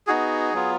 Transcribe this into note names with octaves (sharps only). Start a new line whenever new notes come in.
B3 D#4 F#4 G#4
F#3 B3 F4